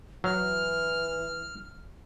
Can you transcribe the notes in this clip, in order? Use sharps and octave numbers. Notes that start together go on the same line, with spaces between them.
E3 F#3 F6